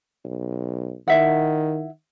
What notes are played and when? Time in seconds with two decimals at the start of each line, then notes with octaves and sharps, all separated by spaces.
0.25 B1
1.08 D#3 E4 E5 F#5